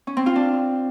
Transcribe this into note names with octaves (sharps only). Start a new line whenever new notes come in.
C#4
C4
F4
D4